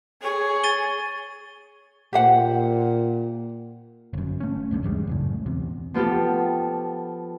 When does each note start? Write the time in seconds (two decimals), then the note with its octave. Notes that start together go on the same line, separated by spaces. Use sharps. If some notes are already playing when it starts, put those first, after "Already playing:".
0.22 G#4 C#5
0.63 A6 D#7 G7
2.13 A#2 G4 C5 F#5
4.13 G1 F#2
4.40 A3 C#4
4.71 F1 C2 F#2 D3
4.83 G#1 E2 G3 G#3
5.07 C#2 F#2 A2
5.46 E2 C3
5.94 F3 B3 F4 G4 A4